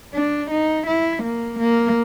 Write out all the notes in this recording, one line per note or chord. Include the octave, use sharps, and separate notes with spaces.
D4
D#4
E4
A#3
A#3